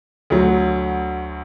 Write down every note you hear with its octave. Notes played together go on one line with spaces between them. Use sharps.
D2 D3 F#3